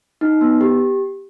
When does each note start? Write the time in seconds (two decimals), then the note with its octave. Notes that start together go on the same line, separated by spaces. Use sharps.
0.21 D#4
0.41 B3
0.61 G4